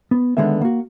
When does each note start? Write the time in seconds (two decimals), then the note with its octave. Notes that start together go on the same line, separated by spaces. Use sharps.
0.11 B3
0.37 D3 D#3 G#3 B3 E5
0.61 A#3 F#4